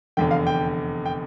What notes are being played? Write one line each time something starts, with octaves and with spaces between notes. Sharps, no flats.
F1 E2 D3 G5
F5
G5
G5